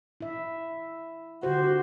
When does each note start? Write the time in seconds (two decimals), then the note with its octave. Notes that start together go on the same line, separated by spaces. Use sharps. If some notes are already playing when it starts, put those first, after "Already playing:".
0.21 E4 E5
1.43 D3 F#4 G4 C5